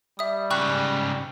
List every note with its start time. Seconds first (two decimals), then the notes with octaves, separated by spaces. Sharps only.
0.19 G3 E5 D#6
0.50 G#2 C#3 G5 C#6 F#6